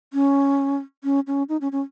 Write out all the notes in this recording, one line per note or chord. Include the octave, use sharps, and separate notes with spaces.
C#4
C#4
C#4
D#4
C#4
C#4